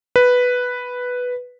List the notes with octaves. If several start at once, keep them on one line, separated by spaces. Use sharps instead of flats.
B4